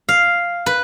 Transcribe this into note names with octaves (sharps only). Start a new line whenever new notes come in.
F5
B4